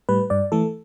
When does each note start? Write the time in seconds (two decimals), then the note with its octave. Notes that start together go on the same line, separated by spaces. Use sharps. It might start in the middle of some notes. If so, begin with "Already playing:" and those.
0.09 A2 G3 B4
0.30 G2 D5
0.52 E3 A3 A4